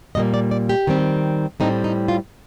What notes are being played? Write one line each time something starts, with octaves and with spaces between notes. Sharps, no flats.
A#2 G3 A#3 D#5
D5
D5
G4
D#3 G3 C4
A2 G3 C4 D#4
D#4
F4